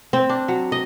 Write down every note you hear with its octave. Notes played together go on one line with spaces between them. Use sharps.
C4
D4
F#3
D#5